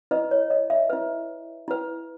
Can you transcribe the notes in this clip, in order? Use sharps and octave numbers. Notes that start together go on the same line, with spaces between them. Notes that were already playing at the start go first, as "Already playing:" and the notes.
E4 B4 D#5
C#5
D#5
E5
E4 B4
E4 B4